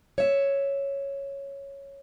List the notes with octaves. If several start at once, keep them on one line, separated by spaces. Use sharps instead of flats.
C#5 E5